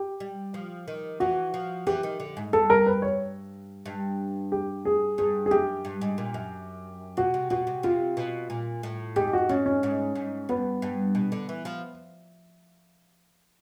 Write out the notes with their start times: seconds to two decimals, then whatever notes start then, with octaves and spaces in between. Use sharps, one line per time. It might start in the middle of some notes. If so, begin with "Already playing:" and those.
Already playing: G4
0.20 G3
0.54 F3
0.88 D#3
1.20 E3 F#4
1.54 F3
1.87 E3 G4
2.03 D#3
2.20 D3
2.37 G#2
2.53 G2 A4
2.70 A#4
2.86 B4
3.02 C#5
3.86 G2
4.52 G4
4.85 G#4
5.18 G2 G#4
5.46 G#4
5.51 F#2 G4
5.85 G2
6.01 G#2
6.18 A#2
6.34 F#2
7.17 B2 F#4
7.34 C3
7.50 B2 F#4
7.67 C3
7.83 C3 F4
8.17 B2
8.50 A#2
8.83 A2
9.16 G#2 G4
9.33 F#4
9.49 G#2 C#4
9.66 C#4
9.83 G#2
10.15 G#2
10.49 G2 B3
10.82 G2
11.15 B2
11.32 D3
11.49 E3
11.65 F3